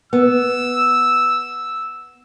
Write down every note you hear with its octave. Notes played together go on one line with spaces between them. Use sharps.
B3 E6